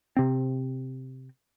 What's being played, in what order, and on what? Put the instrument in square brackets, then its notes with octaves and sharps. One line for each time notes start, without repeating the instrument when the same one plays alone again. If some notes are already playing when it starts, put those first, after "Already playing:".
[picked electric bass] C3 C4